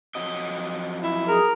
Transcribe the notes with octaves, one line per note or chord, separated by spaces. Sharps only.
F2 F#3 D#5
E4
G#4 A#4